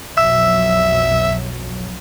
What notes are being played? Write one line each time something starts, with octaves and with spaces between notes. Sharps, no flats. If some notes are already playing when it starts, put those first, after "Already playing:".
B1 F2 F#3 E5 E6